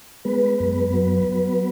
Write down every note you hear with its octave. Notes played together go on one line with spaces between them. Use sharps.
G#3 B3 B4
F#2
F#3
F#3